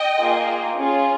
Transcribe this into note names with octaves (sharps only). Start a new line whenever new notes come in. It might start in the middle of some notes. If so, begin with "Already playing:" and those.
Already playing: D#5 G5
A#3 F4 G#4
C#4 F4 G#4